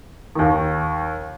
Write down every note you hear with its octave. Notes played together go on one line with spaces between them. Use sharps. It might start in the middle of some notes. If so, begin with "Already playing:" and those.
D#2 D#3